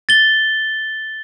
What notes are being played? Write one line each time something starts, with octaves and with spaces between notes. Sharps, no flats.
A6 G7